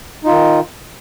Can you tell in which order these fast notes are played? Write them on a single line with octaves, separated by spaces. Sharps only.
D#4 F4 D#3